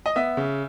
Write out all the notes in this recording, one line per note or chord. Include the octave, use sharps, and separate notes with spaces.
D#5
B3 E5
C#3